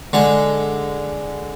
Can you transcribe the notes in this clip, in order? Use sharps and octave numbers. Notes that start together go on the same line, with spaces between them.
D3 G#3